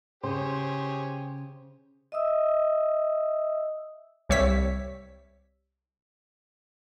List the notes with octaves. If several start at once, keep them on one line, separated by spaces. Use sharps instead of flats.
C#3 G4 G#4 C5 C#5
D#5 E5 D#6 E6
C2 G3 C#5 E5 B6